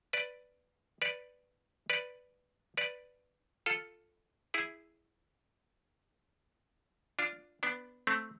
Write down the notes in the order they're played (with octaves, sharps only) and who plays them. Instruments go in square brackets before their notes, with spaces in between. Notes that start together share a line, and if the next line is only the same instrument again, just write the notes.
[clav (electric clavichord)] B4 D5
B4 D5
B4 D5
B4 D5
F4 A4
E4 G#4
D4 F4
B3 D4
A3 C4